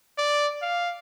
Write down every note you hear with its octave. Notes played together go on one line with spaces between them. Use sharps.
D5
F5